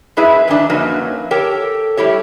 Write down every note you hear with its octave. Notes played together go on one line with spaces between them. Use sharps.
F#2 G#3 E4 G#4 B4 E5
G#2 D#3 E3 D4 E5
F#2 F3 F#3 A#3 D#4 B4
G4 A4 A#4 C#5 G5
G3 A3 E4 G4 C#5